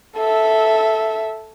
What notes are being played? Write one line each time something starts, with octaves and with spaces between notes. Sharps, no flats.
A4 E5